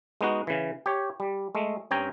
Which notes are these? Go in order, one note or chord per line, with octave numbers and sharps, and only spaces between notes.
G#3 B3 D#4 F#4
C#3 E3
G4 C#5
G3
G#3 A3
G2 C4 C#4 G5 G#5 A#5